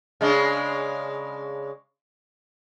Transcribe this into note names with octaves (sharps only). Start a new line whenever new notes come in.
C#3 G#3 D4